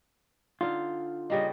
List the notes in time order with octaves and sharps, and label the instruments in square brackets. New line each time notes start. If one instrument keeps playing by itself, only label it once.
[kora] D3 D#4 F5 [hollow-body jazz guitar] F4
[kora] C#3 G3 A#3 [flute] D#5